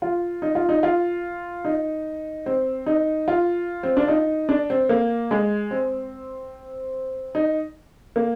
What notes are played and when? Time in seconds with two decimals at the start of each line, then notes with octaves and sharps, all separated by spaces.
0.02 F4
0.42 D#4
0.55 F4
0.69 D#4
0.83 F4
1.65 D#4
2.46 C4
2.86 D#4
3.28 F4
3.83 C4
3.97 D4
4.08 D#4
4.49 D4
4.70 C4
4.89 A#3
5.31 G#3
5.71 C4
7.35 D#4
8.16 A#3